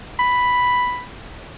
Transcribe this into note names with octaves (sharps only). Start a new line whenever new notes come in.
B5